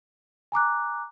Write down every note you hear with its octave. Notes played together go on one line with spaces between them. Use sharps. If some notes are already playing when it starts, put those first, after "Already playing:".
G#5 A#5 D6 F#6